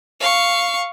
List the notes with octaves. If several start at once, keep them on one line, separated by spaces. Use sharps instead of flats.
F5 C#6